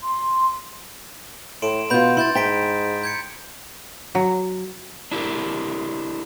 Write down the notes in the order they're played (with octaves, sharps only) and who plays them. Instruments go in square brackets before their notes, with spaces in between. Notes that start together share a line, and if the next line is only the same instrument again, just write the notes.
[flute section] C6
[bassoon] A2 [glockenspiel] C6 D7 E7
[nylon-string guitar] B2 F4 [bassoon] B3 [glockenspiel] B5 G6
[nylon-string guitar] E4 [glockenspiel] C6 G6 A6
[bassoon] G#2 [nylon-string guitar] G5 [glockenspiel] A#5 B6 D7
[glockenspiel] G6 G#6 C#7
[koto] F#3
[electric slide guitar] D4 E4 G4 A4 A#4